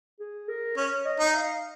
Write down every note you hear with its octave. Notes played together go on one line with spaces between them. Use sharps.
G#4
A#4
C#4 C#5
D#5
D#4
F5